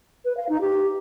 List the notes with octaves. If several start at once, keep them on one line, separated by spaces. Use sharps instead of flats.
B4
F5
D#4
G4